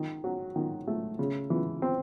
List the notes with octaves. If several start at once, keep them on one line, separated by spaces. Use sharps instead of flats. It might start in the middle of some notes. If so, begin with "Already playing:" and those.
Already playing: D#3
F#3
D#3
A3
C#3
E3
C4